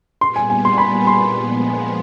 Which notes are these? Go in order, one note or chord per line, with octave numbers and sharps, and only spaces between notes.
A#2 G3 B3 C6
G#5
G#5
C6
B5
C6
A#2 F3 G#3 B3